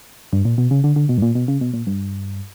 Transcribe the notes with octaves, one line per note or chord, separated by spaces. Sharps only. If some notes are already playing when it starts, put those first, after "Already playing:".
G2
A#2
B2
C#3
D3
D3
B2
G2
A#2
B2
C#3
B2
A#2
G2